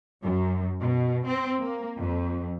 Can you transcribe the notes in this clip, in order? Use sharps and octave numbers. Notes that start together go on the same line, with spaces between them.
F#2
B2
C4
A#3
F2